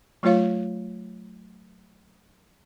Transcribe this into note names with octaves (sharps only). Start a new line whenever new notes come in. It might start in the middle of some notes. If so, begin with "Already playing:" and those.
F#3 A3 F4 C#5 F5